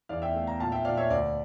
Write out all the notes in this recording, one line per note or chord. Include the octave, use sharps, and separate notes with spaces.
E2 D5 F5
E5 G5
A3
G5 A#5
A#2 F5 A5
E5 G5
A#2 D5 F5
C#5 E5
D2 D5